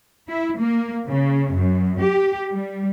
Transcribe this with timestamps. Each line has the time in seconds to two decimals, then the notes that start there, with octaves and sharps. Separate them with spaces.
0.29 E4
0.60 A#3
1.08 C#3
1.54 F#2
2.01 G4
2.52 G3